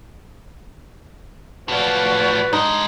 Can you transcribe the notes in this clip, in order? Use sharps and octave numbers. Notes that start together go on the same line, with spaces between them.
A2 F3 F#4 B4 C#5 D5
G2 G#3 D#4